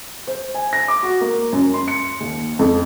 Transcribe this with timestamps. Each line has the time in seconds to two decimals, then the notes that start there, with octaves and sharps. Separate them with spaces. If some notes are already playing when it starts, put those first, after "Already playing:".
0.27 C5
0.54 G#5
0.73 A#6
0.88 D6
1.03 F#4
1.21 A#3
1.53 F#2
1.74 C6
1.88 C#7
2.20 D#2
2.59 F2